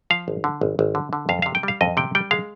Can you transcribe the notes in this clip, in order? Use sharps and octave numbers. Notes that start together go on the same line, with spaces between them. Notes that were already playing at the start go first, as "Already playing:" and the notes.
F3 F5
G#1
D3
G#1
G#1
D3
D3
F2 F5
C3 F5
G5
G3 F5
F2 D#5
C3 G5
G3 G5
G#3 F5